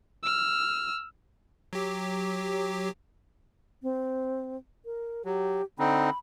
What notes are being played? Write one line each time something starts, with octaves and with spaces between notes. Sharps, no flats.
E6 F6
F#3 G4
C4
A#4
F#3 G4
D3 C4 D#4 B5